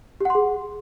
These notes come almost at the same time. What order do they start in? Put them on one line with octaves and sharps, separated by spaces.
G4 F#5 C6 G#4